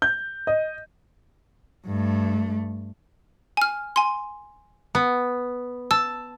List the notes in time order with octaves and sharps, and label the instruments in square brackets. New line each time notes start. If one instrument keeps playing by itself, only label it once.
[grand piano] G6
D#5
[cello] G2 A3
[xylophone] G#5 F6
G#5 C6
[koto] B3
[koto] A5 [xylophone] E6